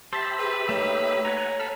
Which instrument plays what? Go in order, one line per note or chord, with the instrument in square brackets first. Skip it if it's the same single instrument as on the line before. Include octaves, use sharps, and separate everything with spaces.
[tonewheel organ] G4 E5 B5 [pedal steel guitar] C5 [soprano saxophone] A5
[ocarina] G#4 [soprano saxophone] B4
[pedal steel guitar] A3 A#3 D#4 [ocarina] C#5
[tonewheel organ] F#5 G#5 [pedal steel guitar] A#5
[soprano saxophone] A4 [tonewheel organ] B5 F6